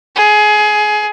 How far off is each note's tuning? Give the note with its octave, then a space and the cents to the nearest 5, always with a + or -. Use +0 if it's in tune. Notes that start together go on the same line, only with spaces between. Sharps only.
G#4 +20